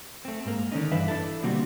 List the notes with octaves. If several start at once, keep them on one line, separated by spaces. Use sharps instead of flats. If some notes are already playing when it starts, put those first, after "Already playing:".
A3 C4
G#2 A#3
D3 D#3 C#4 D#4
G2 E3 B4 E5 F5
D4 E4 A4
B2 D3 G3 A#3 C4 F#4